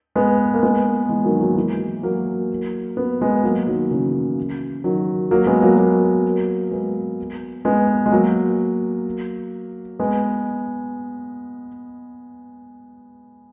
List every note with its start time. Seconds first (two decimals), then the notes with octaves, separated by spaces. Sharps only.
0.16 G#3 B3
0.54 A#3
0.63 G#3 B3
1.09 E3 G#3
1.25 D#3 F#3
1.41 F#3 A#3
1.56 E3 G#3
2.03 F#3 A#3
2.97 B3
3.21 G#3 B3
3.44 F#3 A#3
3.67 D#3 F#3
3.91 C#3 E3
4.84 D#3 F#3
5.31 F#3 A#3
5.47 G#3 B3
5.62 F#3 A#3
5.78 F#3 A#3
6.71 G#3 B3
7.65 G#3 B3
8.06 G#3
8.12 F#3 A#3
9.99 G#3 B3